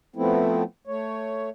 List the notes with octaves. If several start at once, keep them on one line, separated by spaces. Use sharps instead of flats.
F3 A3 B3 C4 E4
A3 C#5